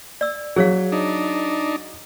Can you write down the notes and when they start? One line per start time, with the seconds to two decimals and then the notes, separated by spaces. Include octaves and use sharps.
0.21 D5 E6
0.56 F#3 G#4 C#5 F5
0.92 D4 D#4